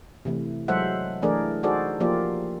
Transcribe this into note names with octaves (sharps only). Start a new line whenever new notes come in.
C3 E3 A3
F#3 G#3 A4 C5 E5 F#5
E3 A3 D4 G#4 A#4 D5
D#4 F#4 G#4 A4 C5 D5
F3 A#3 F4 G4 D5